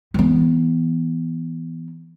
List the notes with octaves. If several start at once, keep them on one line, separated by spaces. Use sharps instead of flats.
E3 B3